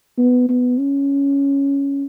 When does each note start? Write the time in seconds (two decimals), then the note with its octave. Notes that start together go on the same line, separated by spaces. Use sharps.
0.18 B3
0.49 B3
0.79 C#4